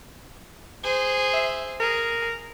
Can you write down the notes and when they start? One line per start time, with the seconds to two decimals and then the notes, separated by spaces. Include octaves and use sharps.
0.84 G#4 C5
1.33 E5
1.80 G#4 A#4